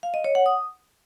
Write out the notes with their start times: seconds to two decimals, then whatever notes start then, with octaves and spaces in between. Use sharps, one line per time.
0.03 F5
0.14 D#5
0.24 C#5
0.35 F#5
0.46 D#6